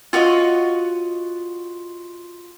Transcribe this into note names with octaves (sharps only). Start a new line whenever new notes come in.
F4 F#4 C#5 D#5